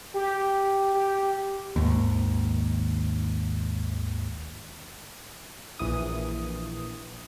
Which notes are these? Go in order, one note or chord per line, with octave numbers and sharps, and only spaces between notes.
G4
G4
G#1 D#2
A#1 E3 D#6